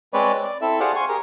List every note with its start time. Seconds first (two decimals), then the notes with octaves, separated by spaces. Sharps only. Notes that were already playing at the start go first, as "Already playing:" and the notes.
0.13 G#3 C4 B4 C#5 D5
0.43 D5
0.62 C4 E4 A4 E5
0.80 G4 G#4 C5 D5 F5 F#5
0.96 G#5 C6 C#6
1.09 G4 G#4 A#4